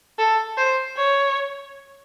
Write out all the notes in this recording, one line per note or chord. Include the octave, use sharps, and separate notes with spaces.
A4
C5
C#5